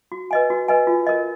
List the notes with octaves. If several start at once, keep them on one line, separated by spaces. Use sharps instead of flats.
F#4
B4 D#5 G#5
F#4
B4 D#5 G#5
F4
A#4 D#5